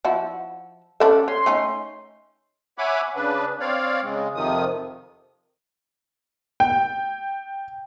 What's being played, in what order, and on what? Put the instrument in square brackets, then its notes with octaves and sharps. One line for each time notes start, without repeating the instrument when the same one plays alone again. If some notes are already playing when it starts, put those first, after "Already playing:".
[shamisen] F3 E4 F#4
[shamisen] C#4 D4 E5 [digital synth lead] A4
[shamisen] C#4 [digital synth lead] C6
[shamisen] A3 C#4 D#4
[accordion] C#5 E5 F#5 G#5 B5 D6
C#3 D4 B4
C4 C#5 D5 F5
C#3 G#3
F2 C3 D#3 F3 D#6
[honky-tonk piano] G5